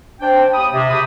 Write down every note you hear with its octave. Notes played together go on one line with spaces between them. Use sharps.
D4 C5 G5
D#2 B5 D#6
C3
G4 G#4 B5 D#6